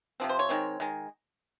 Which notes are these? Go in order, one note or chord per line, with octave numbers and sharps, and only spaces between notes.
C3 F3 C4
C5
C#5
D#3 G#3 C4
D#3 G#3